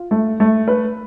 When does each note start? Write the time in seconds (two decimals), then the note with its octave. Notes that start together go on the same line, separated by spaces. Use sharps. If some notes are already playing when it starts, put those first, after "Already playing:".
Already playing: F4
0.11 A3
0.40 A3
0.68 B4